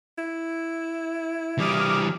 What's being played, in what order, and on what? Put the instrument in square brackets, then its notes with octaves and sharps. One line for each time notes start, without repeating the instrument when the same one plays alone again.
[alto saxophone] E4
[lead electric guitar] E3 G3 [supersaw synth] D6 D#6 F6